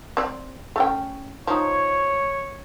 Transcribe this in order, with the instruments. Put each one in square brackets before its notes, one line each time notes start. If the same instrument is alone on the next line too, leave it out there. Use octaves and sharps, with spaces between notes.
[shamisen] C4 D5
A3 C#4 G5
[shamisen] F3 D#4 [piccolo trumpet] C#5